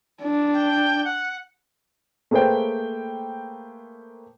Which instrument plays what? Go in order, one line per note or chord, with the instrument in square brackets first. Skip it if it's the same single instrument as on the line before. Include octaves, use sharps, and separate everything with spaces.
[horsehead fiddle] D4
[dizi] G5
F#5
[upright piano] A3 A#3 G#4 B4 C5 G5